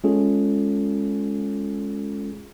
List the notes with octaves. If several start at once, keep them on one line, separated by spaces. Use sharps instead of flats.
G#3 C#4 F4 G#4 A4